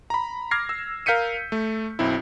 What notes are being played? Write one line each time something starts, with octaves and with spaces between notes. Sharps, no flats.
A#5 B5
D6 F6 G#6 A#6 C7
E6
A#4 F5 G6 B6 C#7 D#7
A3
B1 F#2 C4 E4